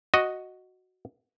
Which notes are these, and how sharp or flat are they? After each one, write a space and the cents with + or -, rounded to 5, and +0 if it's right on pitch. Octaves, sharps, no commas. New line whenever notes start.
F#4 +0 D#5 +0